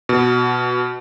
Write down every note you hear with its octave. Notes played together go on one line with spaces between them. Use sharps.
B2